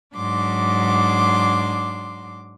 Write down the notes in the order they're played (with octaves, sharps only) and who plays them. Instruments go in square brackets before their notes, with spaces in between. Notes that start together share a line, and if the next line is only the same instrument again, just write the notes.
[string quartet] G#2 F#3 D4 C6 D6